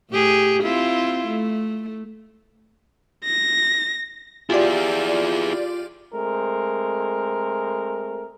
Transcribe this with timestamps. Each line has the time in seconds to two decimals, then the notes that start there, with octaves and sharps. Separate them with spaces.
0.11 A2 G4 G#4
0.63 C4 E4 F4
1.27 A3
3.25 A#6
4.50 E4 F4 G4 G#4 D5
6.12 G#3 A3 C4 A#4